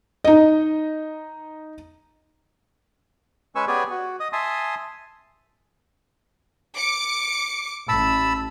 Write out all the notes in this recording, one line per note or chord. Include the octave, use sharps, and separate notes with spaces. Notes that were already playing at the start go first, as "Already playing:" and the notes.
D#4 D#5
G#3 C#4 B4 G#5 C#6 E6
B3 G4 G#4 C#5 D5 G#5
F#4
D#5 D#6
E5 G#5 A5 C6 D#6
D6 C#7
A1 A5 B5 E6